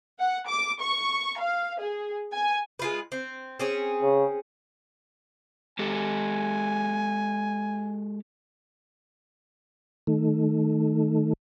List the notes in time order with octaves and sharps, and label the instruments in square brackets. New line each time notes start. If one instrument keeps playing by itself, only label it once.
[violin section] F#5
D6
C#6
F5
G#4
G#5
[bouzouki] G#3 F4 B4
C4
C4 C#4 G#4
[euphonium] C#3
[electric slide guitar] G#3 G4 A4 [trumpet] G#5
[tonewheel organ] D#3 A3